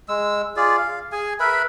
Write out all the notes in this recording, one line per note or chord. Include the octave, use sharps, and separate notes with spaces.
G#3 E6
F4 G#4 D5
F5
G#4 G#5
A#4 B4 E5 B5